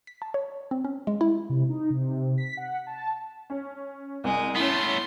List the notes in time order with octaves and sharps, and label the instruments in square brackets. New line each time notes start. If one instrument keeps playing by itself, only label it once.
[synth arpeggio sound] B6
A5
C#5
C4
C#4
G#3
E4
[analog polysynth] C3
D#4
C3
B6
F#5
A5
[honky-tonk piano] C#4
[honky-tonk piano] C2 [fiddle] G#3
[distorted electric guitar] A3 B3 [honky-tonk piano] C#4 E4 [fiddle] C6